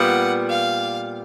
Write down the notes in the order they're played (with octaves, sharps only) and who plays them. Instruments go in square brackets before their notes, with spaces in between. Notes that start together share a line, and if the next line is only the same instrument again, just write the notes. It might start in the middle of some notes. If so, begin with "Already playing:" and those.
Already playing: [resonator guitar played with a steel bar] A#2 G3 B3 [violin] F#5
[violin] F5